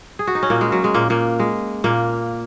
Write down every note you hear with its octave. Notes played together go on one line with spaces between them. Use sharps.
G#4
F#4
D#4
C#4
A#2 A#3
G#3
F#3
G#3
A#2 A#3
A#2 A#3
G#3
A#2 A#3